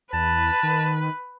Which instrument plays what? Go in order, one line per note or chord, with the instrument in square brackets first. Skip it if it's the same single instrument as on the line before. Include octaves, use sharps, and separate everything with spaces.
[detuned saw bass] E2 [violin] B4 [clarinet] A5
[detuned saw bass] D#3